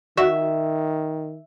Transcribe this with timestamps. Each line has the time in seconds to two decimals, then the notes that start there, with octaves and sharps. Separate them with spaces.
0.17 D#3 F#4 E5